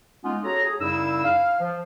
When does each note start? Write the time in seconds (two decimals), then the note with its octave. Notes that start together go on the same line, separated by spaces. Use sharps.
0.24 G#3 A#3 B3 C#4 D#4 F4
0.45 F#4 G#4 A4 C#5 A#5
0.64 G#4
0.81 F#2 C#3 G3 D#4 E4 E6
1.24 F5
1.60 F3